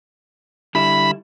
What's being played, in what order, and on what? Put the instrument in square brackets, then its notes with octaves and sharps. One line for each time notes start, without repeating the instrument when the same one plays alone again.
[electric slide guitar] D3 G3 E4 [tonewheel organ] B5